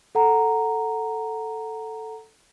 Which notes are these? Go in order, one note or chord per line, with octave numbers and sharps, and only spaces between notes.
A4 F#5 A#5